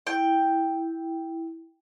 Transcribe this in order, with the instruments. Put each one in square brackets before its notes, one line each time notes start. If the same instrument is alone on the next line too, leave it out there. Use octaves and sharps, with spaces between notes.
[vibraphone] E4 [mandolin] G5